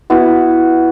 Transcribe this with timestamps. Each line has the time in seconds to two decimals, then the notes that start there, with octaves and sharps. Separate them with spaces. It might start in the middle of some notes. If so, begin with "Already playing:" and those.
0.10 B3 E4 F#4